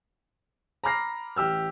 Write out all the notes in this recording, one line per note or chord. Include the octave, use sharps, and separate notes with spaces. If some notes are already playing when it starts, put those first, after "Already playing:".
A#5 B5 D6 F6 A#6 C7
A1 G4 E6 F6